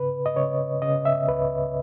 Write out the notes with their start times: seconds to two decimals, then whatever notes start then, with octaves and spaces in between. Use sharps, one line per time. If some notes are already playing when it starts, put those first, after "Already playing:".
Already playing: C#3 B4
0.26 D#5
0.36 C#3 C#5
0.82 C#3 D#5
1.05 E5
1.28 C#2 B4